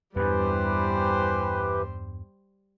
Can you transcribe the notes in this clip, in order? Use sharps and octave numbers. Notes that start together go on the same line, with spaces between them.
E2 G2 E3 G3 G4 B4 C5